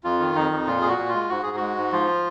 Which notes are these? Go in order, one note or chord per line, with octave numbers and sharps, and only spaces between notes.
F2 F4
D#3
F2 D#4
F2
A#2 F4
A#2 G#4
F#4
A#2
F4
G#3
G#2 F#4
G#2 G#4
G#3 F#4
G#2
F3 F4